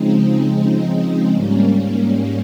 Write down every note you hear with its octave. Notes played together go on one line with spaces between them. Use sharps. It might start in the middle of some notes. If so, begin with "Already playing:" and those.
Already playing: C#3 F3 G#3 C4 D#4
G#2 G3 A#3 C#4